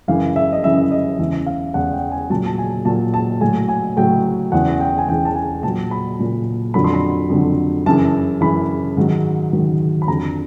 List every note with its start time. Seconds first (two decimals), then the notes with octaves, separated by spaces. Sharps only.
0.08 F#2 C#3 E3 F5
0.36 E5
0.53 D#5
0.64 F#2 C#3 E3 E5
0.92 D#5
1.19 E2 C#3 E3 E5
1.46 F5
1.74 E2 C#3 E3 F#5
1.93 G5
2.12 G#5
2.30 A#2 F#3 A5
2.46 A5
2.58 G#5
2.85 A#2 F#3 A5
3.14 A5
3.41 A2 F#3 G#5
3.69 G#5
3.97 A2 F#3 G5
4.52 E2 C#3 E3 F#5
4.80 G5
4.98 G#5
5.09 E2 C#3 E3 G5
5.25 A5
5.35 G#5
5.63 A#2 F#3 A5
5.91 B5
6.19 A#2 F#3
6.74 F2 D3 F#3 B5
6.84 C6
6.94 B5
7.30 F2 D3 F#3
7.86 F#2 C#3 E3 A5
8.41 F#2 C#3 E3 B5
8.97 G#2 D#3 F#3
9.52 G#2 D#3 F#3
10.02 B5
10.07 F2 D3 F#3 A#5